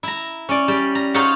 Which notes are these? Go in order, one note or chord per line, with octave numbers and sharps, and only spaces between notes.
E4 A#5
C#4 D5
G3
A#5
D#4 F4 C5 C#5 F5 F#5